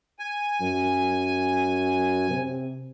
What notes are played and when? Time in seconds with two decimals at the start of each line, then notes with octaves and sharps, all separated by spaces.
0.19 G#5
0.61 F#2
2.30 C3